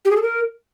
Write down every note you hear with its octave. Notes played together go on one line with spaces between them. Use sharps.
G4
G#4
A4
A#4